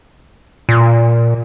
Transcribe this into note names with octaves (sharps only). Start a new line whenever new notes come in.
A#2